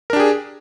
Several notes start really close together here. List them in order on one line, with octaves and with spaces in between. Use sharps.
A#4 D4 G4 G#4